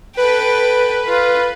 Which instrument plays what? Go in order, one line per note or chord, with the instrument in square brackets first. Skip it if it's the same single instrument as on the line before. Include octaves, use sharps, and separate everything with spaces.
[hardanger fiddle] A4 G5 [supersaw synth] B4
[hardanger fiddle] F4